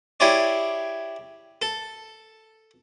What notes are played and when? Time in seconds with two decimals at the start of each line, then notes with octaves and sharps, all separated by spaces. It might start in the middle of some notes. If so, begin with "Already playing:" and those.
0.20 E4 G4 G#4 C#5 D5
1.62 A4